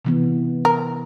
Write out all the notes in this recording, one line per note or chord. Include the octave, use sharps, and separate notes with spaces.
C3 E3 B3
A#4